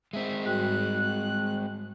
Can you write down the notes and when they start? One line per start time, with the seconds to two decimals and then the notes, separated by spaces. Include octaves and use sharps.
0.13 G#3 C4 E5
0.45 G#2 G3 F#4 F#6